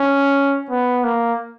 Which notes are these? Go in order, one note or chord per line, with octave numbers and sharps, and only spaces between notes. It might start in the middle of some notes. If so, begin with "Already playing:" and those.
Already playing: C#4
B3
A#3